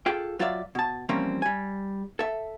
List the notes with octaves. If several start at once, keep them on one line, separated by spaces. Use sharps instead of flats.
F4 G#4 A4 G5
F#3 F4 C#5 D5 E5 F5
B2 A5
E3 F3 G3 A#3 C4 C#4
G3 G#5
A4 E5